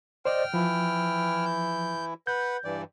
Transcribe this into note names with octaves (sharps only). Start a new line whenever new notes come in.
C5 D5 D#5 G5 F6
E3 F3 E4
G6
B4 F#5 G6
G2 E3 D5